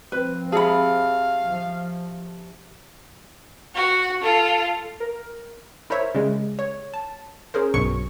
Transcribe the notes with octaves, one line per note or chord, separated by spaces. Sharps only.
F3 C4 B4
G4 G#4 E5 F5 A5 B5
F3
F#4
F4 A4
A#4
E4 A#4 C5 C#5 E5
C#3 G3 G#3
C#5
A5
C#4 G#4 A#4 C5
B1 G2 B2 F#3 C#6 C#7